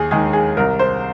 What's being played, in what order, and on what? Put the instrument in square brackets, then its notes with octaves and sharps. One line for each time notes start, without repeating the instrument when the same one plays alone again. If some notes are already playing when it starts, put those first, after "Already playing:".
Already playing: [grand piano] D#2 G#4
D#3 G#3 G#4
G#4
C2 A#4
C5